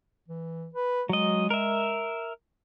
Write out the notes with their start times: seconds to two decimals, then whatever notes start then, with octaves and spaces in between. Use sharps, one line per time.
0.28 E3
0.74 B4
1.09 F#3 G#3 D#5
1.50 A#4 E5